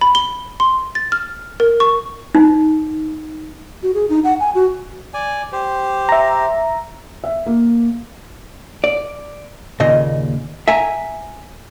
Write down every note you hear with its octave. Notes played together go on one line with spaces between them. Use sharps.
B5
G7
C6
A6
F6
A#4
C#6
D#4
F#4
G#4
D#4
F#5
G#5
F#4
D5 G#5
G4 C5
E5 A#5
E5
A#3
D5
D#2 A#2 C#3 D#5
E5 G#5 A#5